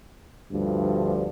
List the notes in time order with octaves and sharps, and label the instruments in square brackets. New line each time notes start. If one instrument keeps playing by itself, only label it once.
[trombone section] D2 G2 F3